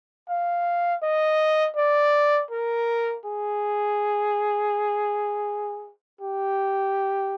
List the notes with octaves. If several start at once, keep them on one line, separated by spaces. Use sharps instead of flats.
F5
D#5
D5
A#4
G#4
G4